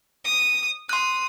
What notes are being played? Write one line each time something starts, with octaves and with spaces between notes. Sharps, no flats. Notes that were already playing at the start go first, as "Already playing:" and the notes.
D#6
C6 D#6 F#6